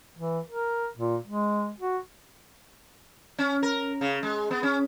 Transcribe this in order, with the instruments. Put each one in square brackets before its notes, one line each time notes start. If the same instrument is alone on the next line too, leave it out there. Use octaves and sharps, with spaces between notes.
[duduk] E3
A#4
A#2
G#3
F#4
[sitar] C#4
A#4
C#3
G#3
B3
C#4